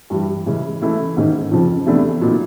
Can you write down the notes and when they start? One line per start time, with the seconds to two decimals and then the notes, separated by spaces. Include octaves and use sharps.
0.10 G2 E3 G3
0.46 C#3 E3 G#3 C#4
0.82 E3 A3 C#4 E4
1.17 G#2 D#3 G#3 C#4
1.51 F2 C#3 F3
1.86 E2 C3 E3 A3 D4
2.21 A#2 F#3 B3 D#4